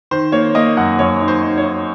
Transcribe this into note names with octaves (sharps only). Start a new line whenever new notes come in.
D#3 C5
A#3 C#5
A#3 D#5
F#2 F#5
F#2 C#5
D#4
C5
D#4
C#5
D#4